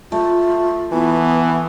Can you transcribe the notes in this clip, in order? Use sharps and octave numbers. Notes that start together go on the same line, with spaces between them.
A3 F4
E3 B3